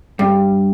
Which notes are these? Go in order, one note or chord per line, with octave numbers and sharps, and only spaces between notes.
G2